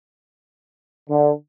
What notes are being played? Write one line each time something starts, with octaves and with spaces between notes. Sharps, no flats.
D3